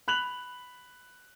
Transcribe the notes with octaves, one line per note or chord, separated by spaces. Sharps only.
B5 F#6 F7 F#7